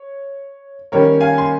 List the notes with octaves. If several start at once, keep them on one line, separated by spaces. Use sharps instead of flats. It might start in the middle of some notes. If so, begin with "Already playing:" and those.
Already playing: C#5
D#3 G3 A#3 C#4 A#4 C#5
F5 G#5
C6